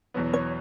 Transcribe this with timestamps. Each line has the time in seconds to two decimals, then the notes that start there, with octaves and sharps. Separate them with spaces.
0.14 E2 B2 F#3 B3
0.33 C#5